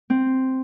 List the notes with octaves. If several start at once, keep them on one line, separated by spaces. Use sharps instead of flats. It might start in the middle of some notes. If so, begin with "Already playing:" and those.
C4